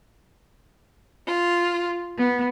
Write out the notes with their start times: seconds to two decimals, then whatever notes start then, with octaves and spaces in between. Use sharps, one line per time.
1.26 F4
2.16 B3